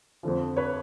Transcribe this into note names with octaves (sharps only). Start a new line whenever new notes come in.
F2 D3 F3
B4 C#5